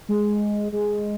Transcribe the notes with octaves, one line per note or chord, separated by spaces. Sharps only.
G#3
G#3